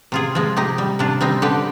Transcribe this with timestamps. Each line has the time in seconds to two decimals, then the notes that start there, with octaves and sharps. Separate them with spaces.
0.12 C3 F4 G#4
0.35 F3 G#3
0.57 C3 D#4 G4
0.78 G3
0.99 C3 D4 F4
1.21 G3 C4 D#4
1.42 D3 G4 B4